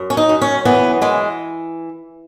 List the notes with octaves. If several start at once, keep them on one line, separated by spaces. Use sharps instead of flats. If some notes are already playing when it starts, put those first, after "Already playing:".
Already playing: F#2
C#4
D#4
F#2
C#4
E3 B3
E3 G#3